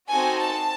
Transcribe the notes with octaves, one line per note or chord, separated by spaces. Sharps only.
C4 D#4 F#4 A4 G#5
A5